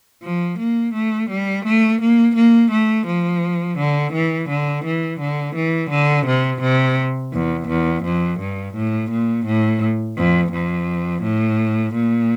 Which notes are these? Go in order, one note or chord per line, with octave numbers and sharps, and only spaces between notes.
F3
A#3
A3
G3
A3
A#3
A#3
A3
F3
D3
E3
D3
E3
D3
E3
D3
C3
C3
E2
E2
F2
G2
A2
A#2
A2
F2
F2
A2
A#2